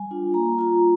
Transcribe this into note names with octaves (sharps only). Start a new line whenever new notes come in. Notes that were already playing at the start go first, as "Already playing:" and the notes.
Already playing: G3 G#5
D4 F4
A#3 A#5
F4 A#5